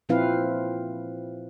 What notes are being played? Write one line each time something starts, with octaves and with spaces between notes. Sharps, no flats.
A#2 F3 C4 E4 B4 F5